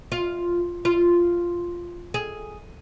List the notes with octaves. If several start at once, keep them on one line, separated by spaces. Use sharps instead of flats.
F4
F4
G#4